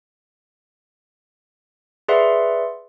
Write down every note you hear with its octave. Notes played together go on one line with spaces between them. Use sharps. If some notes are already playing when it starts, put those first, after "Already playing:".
G#4 B4 D5 E5 F#5 C6